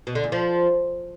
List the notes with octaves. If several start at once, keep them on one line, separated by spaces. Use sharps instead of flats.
B2
D3
E2
F3